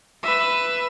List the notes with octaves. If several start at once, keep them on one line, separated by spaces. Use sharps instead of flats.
B4 E5